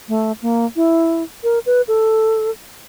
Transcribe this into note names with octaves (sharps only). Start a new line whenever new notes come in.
A3
A#3
E4
A#4
B4
A4